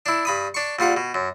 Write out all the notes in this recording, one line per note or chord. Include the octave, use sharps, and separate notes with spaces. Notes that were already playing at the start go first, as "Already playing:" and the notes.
D4 E4
G2 B5 D#6
D4 C#6
A#1 G3 F4 F#5
B2
F#2